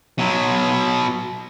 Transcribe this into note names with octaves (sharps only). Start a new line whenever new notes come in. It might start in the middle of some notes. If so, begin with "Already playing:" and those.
B2 F#3